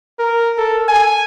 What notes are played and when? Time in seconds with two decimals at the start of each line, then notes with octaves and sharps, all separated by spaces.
0.19 A#4
0.58 A4
0.88 G#5